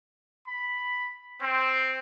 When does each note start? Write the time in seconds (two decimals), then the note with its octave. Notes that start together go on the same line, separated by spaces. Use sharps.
0.46 B5
1.40 C4